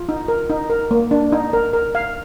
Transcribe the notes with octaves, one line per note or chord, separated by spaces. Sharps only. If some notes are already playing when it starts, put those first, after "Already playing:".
Already playing: F4
D#4
A#4
D#4
A#4
A#3
D4
D#4
A#4
A#4
F5